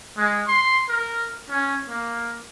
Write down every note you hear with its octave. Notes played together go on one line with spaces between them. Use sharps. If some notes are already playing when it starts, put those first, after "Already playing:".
G#3
C6
A#4
C#4
A#3